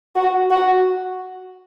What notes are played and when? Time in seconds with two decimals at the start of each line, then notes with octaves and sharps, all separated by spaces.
0.15 F#4
0.50 F#4